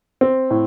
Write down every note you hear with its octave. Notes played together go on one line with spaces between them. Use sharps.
C4
A2